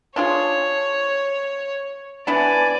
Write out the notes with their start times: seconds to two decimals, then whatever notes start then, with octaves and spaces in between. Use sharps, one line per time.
0.16 D4 F4 G#4 C#5
2.27 E3 B3 D4 D5 G#5